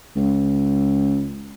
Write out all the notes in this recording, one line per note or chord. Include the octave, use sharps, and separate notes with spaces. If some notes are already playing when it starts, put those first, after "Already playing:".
C#2